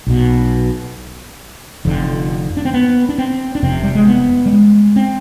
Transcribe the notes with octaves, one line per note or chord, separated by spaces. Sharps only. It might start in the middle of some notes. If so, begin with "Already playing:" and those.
B1 B2
F1 F2 D3
D4
C4
B3
D4
C4
D4
F1 F2 C3 C4
G3
G#3
B3
G3
G#3
C4